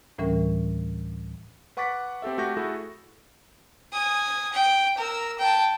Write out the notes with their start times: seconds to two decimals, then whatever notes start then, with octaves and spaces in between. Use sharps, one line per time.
0.18 D2 A2 E3 G3 C#4 A#4
1.77 B4 F#5 C#6 D6 A6 B6
2.22 C4 G4 A4 E5
2.38 A3 F#4 G4 G6 A#6
2.57 A3 E4 F#4 G#4 A4
3.93 G#5 D#6
4.53 G5
4.98 A#4 E6
5.38 G5 A5